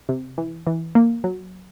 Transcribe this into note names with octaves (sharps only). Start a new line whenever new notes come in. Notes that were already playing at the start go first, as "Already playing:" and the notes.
C3
E3
E3
A#3
F#3